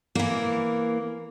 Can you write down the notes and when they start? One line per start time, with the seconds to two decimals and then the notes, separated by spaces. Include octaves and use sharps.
0.15 E3 A#3